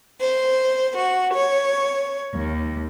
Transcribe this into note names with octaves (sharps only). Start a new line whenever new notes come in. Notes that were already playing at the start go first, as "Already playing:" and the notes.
C5
F#4
C#5
D#2